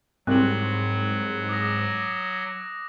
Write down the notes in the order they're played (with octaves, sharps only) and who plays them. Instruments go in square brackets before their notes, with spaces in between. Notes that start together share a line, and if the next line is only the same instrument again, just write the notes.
[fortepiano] C2 [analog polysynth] G#2 [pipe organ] F#3 [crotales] F#6 F#7
[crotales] D6 D#6 A#6